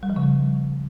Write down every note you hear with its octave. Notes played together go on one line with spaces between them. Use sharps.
G3
F3
C#3
G3